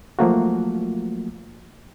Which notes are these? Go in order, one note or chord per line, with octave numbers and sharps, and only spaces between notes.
F3 F#3 A3 A#3 F4 F#4